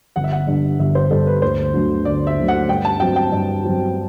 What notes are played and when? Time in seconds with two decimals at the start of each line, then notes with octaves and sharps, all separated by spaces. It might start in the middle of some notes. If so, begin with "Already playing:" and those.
0.16 G1 F#5
0.24 E5
0.32 F#5
0.47 G2 D3
0.79 G1 E5
0.95 C5
1.11 G2 D3 A4
1.27 B4
1.42 D2 C5
1.74 D3 F#3 A3
2.05 D2 D5
2.27 E5
2.37 D3 F#3 A3
2.48 F#5
2.69 G2 G5
2.85 A5
3.00 F#3 C4 F#4 G5
3.16 G5
3.32 G2
3.64 F#3 C4 F#4